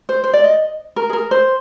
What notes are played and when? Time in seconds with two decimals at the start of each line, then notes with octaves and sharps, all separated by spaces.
0.09 C5
0.24 C5
0.33 D5
0.44 D#5
0.96 A#4
1.10 G#4
1.13 A#4
1.31 C5